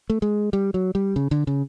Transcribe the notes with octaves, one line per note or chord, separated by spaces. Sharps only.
A3
G#3
G3
F#3
G3
C#3
D3
C#3